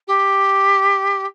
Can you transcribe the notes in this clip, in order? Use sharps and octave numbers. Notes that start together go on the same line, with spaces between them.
G4